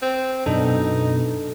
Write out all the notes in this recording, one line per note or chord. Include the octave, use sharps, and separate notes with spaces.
C4
F#2 B2 D4 D#4 A4